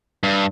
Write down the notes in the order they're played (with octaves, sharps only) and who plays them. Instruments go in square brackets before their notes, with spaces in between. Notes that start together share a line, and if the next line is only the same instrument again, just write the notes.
[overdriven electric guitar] G2